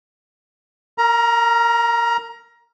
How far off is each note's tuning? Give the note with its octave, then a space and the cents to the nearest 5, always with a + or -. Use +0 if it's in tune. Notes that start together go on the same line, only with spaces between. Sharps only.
A#4 -20 A#5 +20